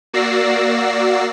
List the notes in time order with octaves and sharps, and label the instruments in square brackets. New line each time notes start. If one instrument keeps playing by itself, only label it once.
[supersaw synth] A#3 F#4 D5 E6 A#6 C7